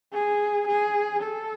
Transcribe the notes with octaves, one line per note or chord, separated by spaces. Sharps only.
G#4
G#4
A4